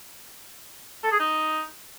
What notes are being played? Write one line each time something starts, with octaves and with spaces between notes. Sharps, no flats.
A4
G#4
D#4